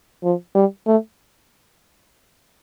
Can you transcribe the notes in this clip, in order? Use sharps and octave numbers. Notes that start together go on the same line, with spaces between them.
F3
G3
A3